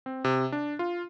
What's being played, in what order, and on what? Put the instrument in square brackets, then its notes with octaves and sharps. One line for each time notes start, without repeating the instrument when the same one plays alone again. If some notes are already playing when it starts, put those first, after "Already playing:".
[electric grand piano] C4
C3
D4
F4